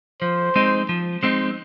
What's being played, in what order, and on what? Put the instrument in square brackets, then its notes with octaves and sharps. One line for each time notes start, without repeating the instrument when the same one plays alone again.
[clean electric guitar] F3 [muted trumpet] C5
[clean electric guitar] G#3 C4 D#4
F3
G#3 C4 D#4